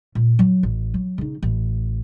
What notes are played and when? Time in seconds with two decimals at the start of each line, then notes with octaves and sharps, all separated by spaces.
0.15 A#2
0.39 F#3
0.63 A1
0.94 F#3
1.18 C#3 D#4
1.43 A1